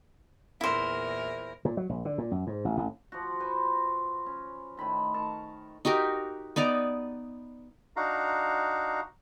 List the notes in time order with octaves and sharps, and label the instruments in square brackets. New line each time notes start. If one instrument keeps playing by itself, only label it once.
[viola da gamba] E2 A#2 A#4 [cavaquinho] E4 C5
[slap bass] A#2
F#3
A#1
D3
A#2
F#2
G#2
A1
A1
[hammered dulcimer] F3 F#4
B4 C5 C#6
C#4
A2 D#3 B5 C6
A#4 A5 C#6
[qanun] D#4 F#4 G4 A#4
B3 D#4 D5 A#5
[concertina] D4 D#4 F#4 F5 A#5